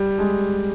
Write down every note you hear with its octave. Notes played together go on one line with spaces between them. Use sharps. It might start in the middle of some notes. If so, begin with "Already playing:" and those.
Already playing: G3
G#3